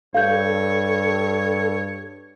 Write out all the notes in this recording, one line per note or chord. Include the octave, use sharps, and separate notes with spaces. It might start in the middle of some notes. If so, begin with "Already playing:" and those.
G2 A4 C#5 F5 G6